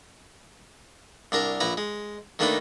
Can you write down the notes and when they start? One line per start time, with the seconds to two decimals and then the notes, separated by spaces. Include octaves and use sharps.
1.32 C2 D4 A#4 A#5
1.60 A#1 E4 B4 A#5
1.77 G#3
2.39 D#3 A3 A#3 D4 D#4 B4